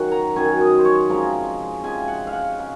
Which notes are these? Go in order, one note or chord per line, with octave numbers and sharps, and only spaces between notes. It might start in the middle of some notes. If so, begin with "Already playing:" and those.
Already playing: F#2 D#3 F#3 C#4 F#5
A#5
F#2 D#3 F#3 C#4 G#5
D#5
C5
C#5
C3 F3 G#3 C#4 A#5
C3 F3 G#3 C#4 G#5
F#5
F5
F#5
C#3